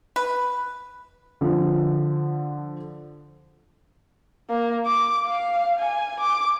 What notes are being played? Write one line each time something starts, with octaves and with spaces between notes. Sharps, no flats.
B4
D3 F3
A#3
D6
F5
G#5
D6